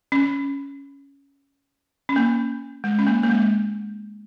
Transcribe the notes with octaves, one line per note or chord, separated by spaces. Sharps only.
C#4
C#4
A#3
G#3
C#4
A#3
A#3
G#3